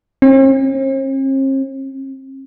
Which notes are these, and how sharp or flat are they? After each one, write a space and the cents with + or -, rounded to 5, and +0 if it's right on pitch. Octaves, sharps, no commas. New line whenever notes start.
C4 +45